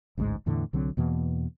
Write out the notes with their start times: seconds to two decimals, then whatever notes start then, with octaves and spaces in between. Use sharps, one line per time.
0.17 A1 D2 G#2 G#3
0.46 E2 A2 D3 E3
0.73 C2 D3 F#3 C4
0.97 E2 B2 E3 A#3